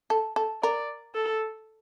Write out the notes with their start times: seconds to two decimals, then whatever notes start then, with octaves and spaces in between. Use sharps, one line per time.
0.10 A4
0.36 A4
0.63 A#4 D5
1.15 A4